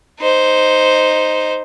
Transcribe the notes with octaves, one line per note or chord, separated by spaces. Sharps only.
D#4 C5